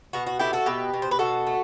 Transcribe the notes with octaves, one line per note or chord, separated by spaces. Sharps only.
B2 F#4
F#4
A3 E4 G4
F#4 A4
B2 G4 B4
B2
C5
B4
B2 F#4 A4
A3